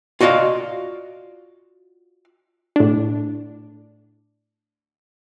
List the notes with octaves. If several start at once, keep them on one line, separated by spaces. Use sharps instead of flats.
F4 F#4 D5 D#5 F5
A2 D4